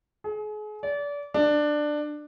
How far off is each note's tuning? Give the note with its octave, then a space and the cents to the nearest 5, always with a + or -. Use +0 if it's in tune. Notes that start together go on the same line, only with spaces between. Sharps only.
G#4 +35
D5 -30
D4 +15